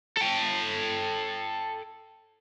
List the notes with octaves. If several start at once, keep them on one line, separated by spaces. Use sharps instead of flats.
A4 G5